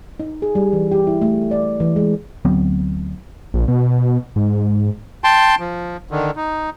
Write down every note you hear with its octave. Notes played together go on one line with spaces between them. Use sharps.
D#4
G#4
G3
E3
G4
E4
A3
D5
E3
G#3
D2 F#3 B3 C4
A#1
B2
G#2
G5 A5 C6
F3
D3 D#3
D#4